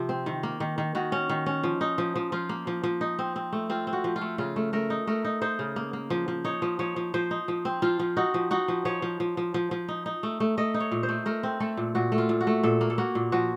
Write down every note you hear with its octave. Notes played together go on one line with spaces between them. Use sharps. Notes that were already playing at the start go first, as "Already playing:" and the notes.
Already playing: C3 F3
C4
D#3
A#3
D#3
D#3
D#3 F#4
C#4
D#3
C#4
F3
D#4
F3
F3
F3 F4
A#3
F3
F3
D#4
C4
C4
A3
C4 F4
C4
F#4
F3
F4
A3
C#3 F4
A3
A3 A#4
D#4
A3 A#4
D#4
D#4 C5
C#3
A#3
A#3
F3
F3
D#4 C#5
F3
F3 C#5
F3
F3 C5
D#4
F3
C4
F3 F4
F3
D#4 F#4
F3
D#4 F#4
F3
F3 C#5
F3
F3
F3
F3
F3
D#4
D#4
A3
A3
A3 D#5
D#4
C#5
A#2
C5
A3
A3 A#4
C4
A3 A4
A#2
A#2 F#4
A3
F4
A#2
F#4
A3
A#2 A4
A#3
A4
A#3 F#4
A#2
F3 F#4